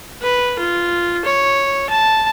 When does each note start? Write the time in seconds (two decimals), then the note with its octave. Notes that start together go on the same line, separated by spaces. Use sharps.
0.22 B4
0.59 F4
1.25 C#5
1.89 A5